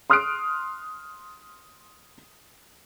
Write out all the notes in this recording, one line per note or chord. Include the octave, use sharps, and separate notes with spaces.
C6 D#6 F6 F#6 C7 D7